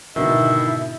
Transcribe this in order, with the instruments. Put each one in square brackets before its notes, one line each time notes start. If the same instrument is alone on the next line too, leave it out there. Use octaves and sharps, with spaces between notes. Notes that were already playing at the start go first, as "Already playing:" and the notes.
[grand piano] G#2 B2 D3 [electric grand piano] D#3 [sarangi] E4 [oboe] E5